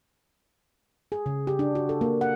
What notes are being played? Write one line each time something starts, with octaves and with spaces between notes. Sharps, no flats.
G#4
C#3
G4
D4
F#4
A4
A#3
F#5